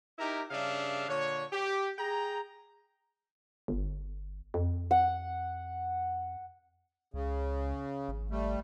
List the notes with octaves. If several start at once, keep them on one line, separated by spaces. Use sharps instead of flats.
D#4 E4 G4 A#4
G2 C#3 D4 E5 F5
A#2 D3 C#5
G4
G#4 G5 A#5
G1
F2
F#5
C#2 C#3
G#1
G3 A3